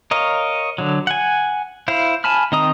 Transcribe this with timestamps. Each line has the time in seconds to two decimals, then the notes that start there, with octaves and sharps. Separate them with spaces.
0.11 A#4 C#5 D#5 F5
0.78 D3 F#3
1.07 F#5 G#5
1.88 E4 C5 F5
2.24 G#5 A5 B5 F6
2.52 D#3 C4 D#5 A#5 D#6